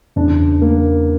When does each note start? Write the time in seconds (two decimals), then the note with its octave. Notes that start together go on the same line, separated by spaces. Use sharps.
0.16 E2 C#3 E3 D4
0.62 A#3